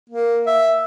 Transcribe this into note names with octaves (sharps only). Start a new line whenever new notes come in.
A#3
E5